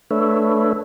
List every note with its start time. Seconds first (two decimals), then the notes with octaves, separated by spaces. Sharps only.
0.11 A3 D4 A4 B4 C#5 E5